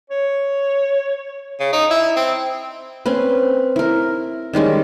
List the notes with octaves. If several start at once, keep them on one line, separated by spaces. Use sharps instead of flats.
C#5
C#3
D#4
E4
C4
C4 C#4 B4
E4 A#4
D#3 G3 G#3 C#4